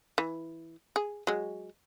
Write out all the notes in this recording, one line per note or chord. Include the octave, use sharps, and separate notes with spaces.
E3
G#4
F#3 G#3